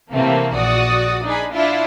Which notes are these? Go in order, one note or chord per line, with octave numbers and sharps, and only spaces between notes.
C3 E3 A3 A#3 C4
A#1 F#4 D5 D#6
D4 D#4 G#4 B5
D4 E4 F4 E5